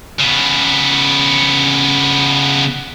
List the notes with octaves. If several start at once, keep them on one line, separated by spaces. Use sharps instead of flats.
C#3 B3